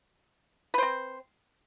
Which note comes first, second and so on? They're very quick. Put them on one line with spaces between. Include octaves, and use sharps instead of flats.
B4 C5 C4